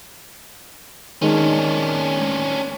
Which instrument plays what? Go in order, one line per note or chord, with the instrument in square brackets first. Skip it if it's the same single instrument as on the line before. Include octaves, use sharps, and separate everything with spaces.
[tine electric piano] D#3 G#3 [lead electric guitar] C#4 D4